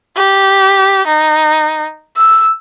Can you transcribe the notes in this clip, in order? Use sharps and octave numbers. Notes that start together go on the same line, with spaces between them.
G4
D#4
E6